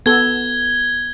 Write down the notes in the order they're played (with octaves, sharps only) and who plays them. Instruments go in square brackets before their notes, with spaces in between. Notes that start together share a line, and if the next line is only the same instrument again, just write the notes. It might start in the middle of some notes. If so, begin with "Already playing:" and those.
[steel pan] B3 A4 [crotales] G#6 G7